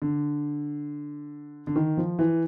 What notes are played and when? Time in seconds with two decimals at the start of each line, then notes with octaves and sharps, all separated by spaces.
0.02 D3
1.67 D3
1.76 D#3
1.97 F3
2.19 E3